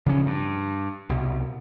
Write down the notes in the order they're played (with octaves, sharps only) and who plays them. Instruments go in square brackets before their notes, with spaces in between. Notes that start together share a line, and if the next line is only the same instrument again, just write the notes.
[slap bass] C#3 F3 C#4
G2
C2 B2